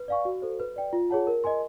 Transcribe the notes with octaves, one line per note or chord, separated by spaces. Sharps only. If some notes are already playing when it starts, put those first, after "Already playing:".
Already playing: B4
D5 F5 G#5 C#6
F#4
A4 C5
B4
D5 G5
F4
G#4 C#5 F#5 A5
A#4
D#5 G#5 C6